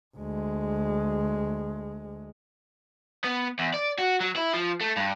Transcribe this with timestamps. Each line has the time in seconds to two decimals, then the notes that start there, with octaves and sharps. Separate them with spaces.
0.17 D2 G#3
3.25 B3
3.59 E2
3.74 D5
3.98 F#4
4.20 F#3
4.36 E4
4.54 F3
4.81 A3
4.97 G2